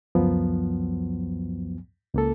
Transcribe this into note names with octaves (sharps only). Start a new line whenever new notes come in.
C#2 F#2 F3 F#3 B3
C#2 A#3 A4